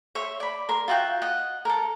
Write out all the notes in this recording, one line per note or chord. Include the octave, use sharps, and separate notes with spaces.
C#5 E5 C6
D5 B5
A#4 C6
F4 F#4 E5 G5
D#5 F#5
A4 A#4